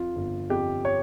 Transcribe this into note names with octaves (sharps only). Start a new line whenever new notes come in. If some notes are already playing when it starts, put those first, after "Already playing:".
Already playing: F2 F4
G1
F2 G4
C#5